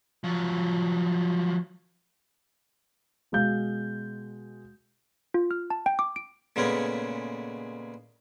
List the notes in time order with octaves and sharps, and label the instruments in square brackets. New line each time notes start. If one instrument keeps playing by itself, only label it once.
[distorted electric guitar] F3 F#3
[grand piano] B2 G#3 F5 G6
[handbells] F4
F6
A5
G5
D6
D7
[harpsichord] A#2 C#3 G#3 A3 B3 C#4